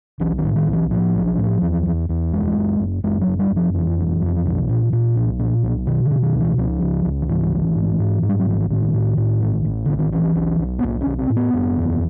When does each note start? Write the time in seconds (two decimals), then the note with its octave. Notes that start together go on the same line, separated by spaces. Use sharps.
0.20 B1 E3
0.38 D#3
0.43 A2
0.56 D#3
0.67 B1
0.73 E3
0.91 A2 F3
1.15 B1
1.38 A2
1.62 E2
1.86 E2
2.09 E2
2.33 F#1 G#3
2.57 F#1
2.80 F#1
3.04 F#1 G#3
3.21 F#3
3.27 F#1
3.39 G3
3.51 F#1
3.56 F3
3.74 F2 E3
3.98 F#1
4.22 F2
4.46 B1
4.69 A#2
4.93 A#2
5.16 B1
5.39 A#2
5.63 B1
5.87 B2 D#3
6.05 D3
6.11 B2
6.23 D#3
6.34 C#2
6.40 E3
6.58 C#2 F3
6.81 C#2
7.05 C#2
7.22 D#3
7.28 G#2 E3
7.52 G#1
7.76 G#2
7.99 G#2
8.22 G#2
8.29 G3
8.40 F#3
8.47 G#1 F3
8.60 E3
8.70 A2 D#3
8.94 A2
9.17 A2
9.41 A1
9.65 A1
9.85 A1 D3
9.99 D#3
10.12 B1 E3
10.35 B1
10.59 B1
10.79 B3
10.83 B1 A#3
11.00 C#4
11.06 B1
11.18 C4
11.30 A2
11.36 B3
11.54 F#1
11.77 E2